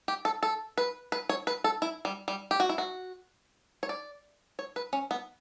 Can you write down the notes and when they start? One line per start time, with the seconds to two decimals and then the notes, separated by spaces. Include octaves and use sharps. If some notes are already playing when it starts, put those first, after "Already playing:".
0.08 G4
0.25 A4
0.43 A4
0.78 B4
1.12 B4
1.29 C#5
1.47 B4
1.64 A4
1.82 E4
2.05 G3
2.28 G3
2.51 G4
2.60 F#4
2.69 E4
2.78 F#4
3.83 C#5
3.89 D5
4.59 C#5
4.76 B4
4.93 C#4
5.11 B3